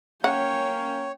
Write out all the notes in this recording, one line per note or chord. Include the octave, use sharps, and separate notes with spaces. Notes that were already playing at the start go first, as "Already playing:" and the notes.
A#3 C#4 C#5 F#5 G5